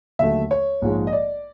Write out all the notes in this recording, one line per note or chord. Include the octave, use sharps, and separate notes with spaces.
D#2 D3 F#3 A3 E5
C#5
A#1 G#2 F3 G#3
D#5
D5